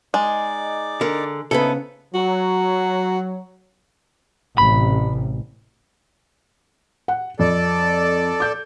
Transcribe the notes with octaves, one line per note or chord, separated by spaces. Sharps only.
G#3 D#4 D5 D6
D3 A#4
C#3 B3 D#4 E4 A4 B4
F#3 F#4
A1 C3 B5
F#5
F2 A4 D5
D6 G6